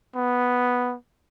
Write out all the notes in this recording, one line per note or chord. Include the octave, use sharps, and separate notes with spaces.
B3